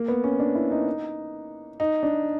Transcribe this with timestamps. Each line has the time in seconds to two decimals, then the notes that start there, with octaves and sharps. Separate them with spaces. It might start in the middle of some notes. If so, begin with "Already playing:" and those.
Already playing: A#3
0.08 B3
0.24 C#4
0.40 D4
0.55 E4
0.71 D#4
1.80 D#4
2.03 D4